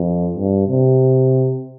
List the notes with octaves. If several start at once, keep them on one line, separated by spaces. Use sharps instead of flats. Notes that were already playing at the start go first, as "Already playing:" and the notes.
Already playing: F2
G2
C3